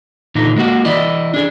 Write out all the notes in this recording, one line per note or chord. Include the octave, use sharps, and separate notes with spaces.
A#2 D3 E3 D#4
G#3 A#3 F#4 F#5
E3 E4 D5 D#5
D4 G#4